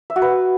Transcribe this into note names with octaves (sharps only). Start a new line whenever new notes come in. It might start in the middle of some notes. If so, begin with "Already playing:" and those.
E5
F#4
B4